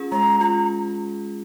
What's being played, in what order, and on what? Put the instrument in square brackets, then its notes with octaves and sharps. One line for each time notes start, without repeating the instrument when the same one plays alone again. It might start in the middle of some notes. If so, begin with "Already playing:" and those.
Already playing: [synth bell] C#4 F4 G#4
[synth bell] G#3 [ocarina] A#5
[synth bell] F4 [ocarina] A#5